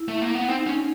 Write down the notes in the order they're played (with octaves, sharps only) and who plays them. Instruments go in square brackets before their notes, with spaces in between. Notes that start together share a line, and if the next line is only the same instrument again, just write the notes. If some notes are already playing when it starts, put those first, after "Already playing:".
Already playing: [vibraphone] E4
[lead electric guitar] A3
A#3
B3
[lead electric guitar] C4 [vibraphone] D#4
[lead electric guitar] C#4